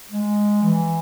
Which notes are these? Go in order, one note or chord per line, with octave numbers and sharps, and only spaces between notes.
G#3
E3